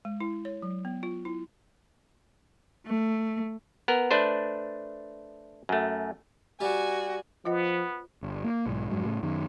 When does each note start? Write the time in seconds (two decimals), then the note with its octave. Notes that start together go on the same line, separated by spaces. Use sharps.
0.05 G#3
0.20 E4
0.45 C#5
0.62 F#3
0.85 B3
1.03 F4
1.25 E4
2.86 A3
3.88 B3 A#4
4.11 A3 D4 B4 C5
5.69 F#2 A3
6.61 G3 F#4 G#5
7.45 F3 B3 F4 C5 D#5
8.23 G1
8.44 A#3
8.66 B1 G#2
8.90 F2 G#2 F#3
9.05 A2 C#3
9.23 F#2 D#3